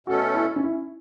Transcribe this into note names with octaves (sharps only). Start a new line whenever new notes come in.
B2 A3 C#4 F#4 A4
E4
C#4
E4